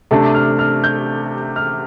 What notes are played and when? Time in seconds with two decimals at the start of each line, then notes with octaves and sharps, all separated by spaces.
0.11 C3 A3 D4 A5
0.35 F6
0.59 F6
0.84 G6
1.56 F6